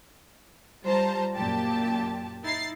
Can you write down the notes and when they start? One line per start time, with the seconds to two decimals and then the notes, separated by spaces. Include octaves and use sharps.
0.84 G3 F4 C5 A5 A#5
1.35 F#2 A#2 G4 A5
2.44 D#4 E4 A6 C7